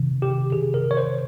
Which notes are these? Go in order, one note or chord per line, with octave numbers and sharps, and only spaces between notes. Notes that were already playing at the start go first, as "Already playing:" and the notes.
Already playing: C3 D#3
G4
C3 D#3 G#4
A#4
C#5
C5